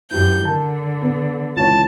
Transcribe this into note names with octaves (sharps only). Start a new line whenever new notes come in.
F#2 E4 G4 G6
D3 A#4 A5
B3
C#2 E3 C#5 A5